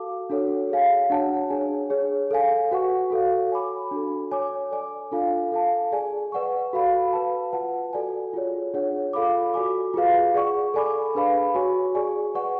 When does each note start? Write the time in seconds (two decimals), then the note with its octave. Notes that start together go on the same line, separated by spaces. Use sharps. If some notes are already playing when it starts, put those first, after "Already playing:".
Already playing: F#4 A4 F5 A5 D6
0.30 D4 F#4 A4 C#5 F#5
0.69 G#4 C#5 F5 G#5
1.10 D4 F#4 C#5 F#5 A5
1.50 D4 G#4 C#5 G#5
1.90 D4 G#4 C#5
2.31 A4 F5 G#5
2.72 F#4 B4 F#5 C#6
3.11 F#4 A4 C#5 F5
3.51 C#5 G#5 B5 D6
3.91 D4 F#4 A4
4.31 C#5 G#5 D6
4.71 A4 D5 G#5 D6
5.12 D4 F4 A4 F5 G#5
5.52 A4 F5 A5
5.92 G#4 D5 G#5
6.32 B4 D5 F#5 C#6
6.73 F#4 A4 F5 B5
7.13 B4 F5 A5
7.52 F4 B4 F#5 A5
7.93 F#4 A4 D5 G#5
8.34 F4 G#4 C#5
8.74 D4 F4 G#4 C#5 F#5
9.13 F4 A4 F5 B5 D6
9.54 F#4 A4 D5 G#5 D6
9.94 F4 G#4 B4 F5
10.34 G#4 D5 F#5 C#6
10.74 A4 D5 G#5 B5 D6
11.15 D4 G#4 B4 F5 B5
11.55 F#4 C#5 G#5 C#6
11.95 G#4 D5 G#5 C#6
12.35 B4 D5 F#5 C#6